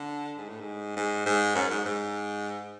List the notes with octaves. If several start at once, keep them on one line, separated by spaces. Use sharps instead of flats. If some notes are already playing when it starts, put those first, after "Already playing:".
Already playing: D3
G#2
A2
G#2
G#2
G#2
F#2
G#2
G#2